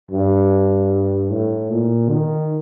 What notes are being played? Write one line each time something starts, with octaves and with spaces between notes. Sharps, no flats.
G2
A2
A#2
D#3